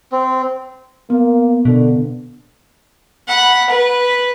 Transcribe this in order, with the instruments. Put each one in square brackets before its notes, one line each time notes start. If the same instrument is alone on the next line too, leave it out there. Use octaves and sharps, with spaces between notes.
[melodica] C4
[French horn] A#3 [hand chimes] B3
[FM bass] B2 [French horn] D3
[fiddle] F#5 B5
B4